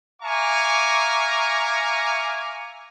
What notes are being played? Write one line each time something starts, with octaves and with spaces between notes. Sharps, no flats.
E5 F5 G#5 A#5 C#6 D6